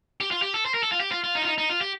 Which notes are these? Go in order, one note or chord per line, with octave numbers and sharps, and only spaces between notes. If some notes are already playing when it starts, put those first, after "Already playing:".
G4
F4
G4
A4
C5
A#4
A4
F4
G4
F4
F4
D#4
F4
D#4
D#4
F4
G4